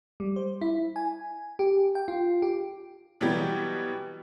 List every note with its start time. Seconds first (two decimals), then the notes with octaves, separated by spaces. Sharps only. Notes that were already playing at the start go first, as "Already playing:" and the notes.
0.20 G3
0.36 C5
0.61 E4
0.96 G#5
1.59 G4
1.95 G5
2.08 F4
2.42 G4
3.21 B2 E3 F#3 G3 B3 G4